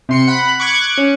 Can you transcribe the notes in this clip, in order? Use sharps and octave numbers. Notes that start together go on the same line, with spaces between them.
C3 C6 C#7
F#5 B5
C#6 D6 F#6 G#6 C#7
C#4